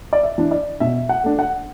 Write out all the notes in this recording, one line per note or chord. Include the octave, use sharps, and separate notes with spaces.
D5
E5
E3 D4
D5
B2 E5
F#5
A3 D4
F#5